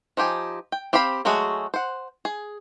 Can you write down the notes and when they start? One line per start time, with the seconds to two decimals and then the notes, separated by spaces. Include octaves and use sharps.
0.17 F3 D#4 G4 G#5
0.72 G5
0.93 C4 G4 C5 F5 B5
1.25 F#3 G#3 A3 F#4 G#4
1.74 C5 F#5
2.25 G#4